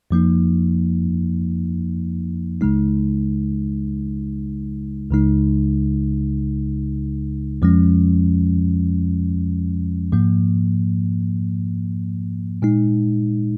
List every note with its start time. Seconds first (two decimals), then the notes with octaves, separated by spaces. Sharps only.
0.11 F2 F3 A#3 D#4
2.61 C#2 C#3 G#3 D#4
5.11 C#2 C#3 G#3 D#4
7.62 F2 F3 G#3 C#4
10.12 G#2 F3 A#3
12.62 A#2 G#3 D#4